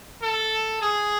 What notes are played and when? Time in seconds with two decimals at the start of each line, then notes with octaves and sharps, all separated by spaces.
0.22 A4
0.82 G#4